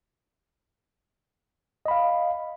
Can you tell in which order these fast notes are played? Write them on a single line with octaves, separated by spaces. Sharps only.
D#5 B5 F5